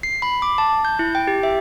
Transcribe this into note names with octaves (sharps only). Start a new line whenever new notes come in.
C7
B5
D6
A5
G6
E4
G5
G4
E5